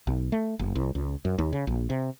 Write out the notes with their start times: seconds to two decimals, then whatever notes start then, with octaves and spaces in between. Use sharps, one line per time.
0.07 B1
0.32 A3
0.59 F#1
0.75 C2
0.95 C#2
1.25 F#2
1.38 D#2
1.53 C#3
1.67 A#1
1.90 C3